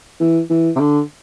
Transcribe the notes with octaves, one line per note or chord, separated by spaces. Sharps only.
E3
E3
C3
D3